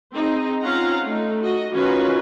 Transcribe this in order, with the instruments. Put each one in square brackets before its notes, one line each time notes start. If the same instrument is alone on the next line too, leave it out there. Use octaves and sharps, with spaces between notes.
[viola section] C4 D#4 G#4
C4 C#4 F4 F5 F#5 A#5
A3 D#4
F#4 D#5
D#3 C#4 F4 F#4 B4